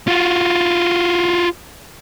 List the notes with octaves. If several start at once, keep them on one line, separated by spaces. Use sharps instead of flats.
F4 F#4